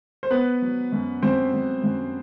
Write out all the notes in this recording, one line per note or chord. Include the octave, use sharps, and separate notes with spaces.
C5
B3 B4
F#3
F#2
F#2 C4 C5
F#2
F#2